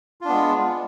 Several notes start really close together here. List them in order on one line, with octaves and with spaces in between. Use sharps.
F4 D4 B3 G#3